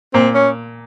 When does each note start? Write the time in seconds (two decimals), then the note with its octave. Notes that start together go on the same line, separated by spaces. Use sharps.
0.14 A#2 C4
0.35 C#4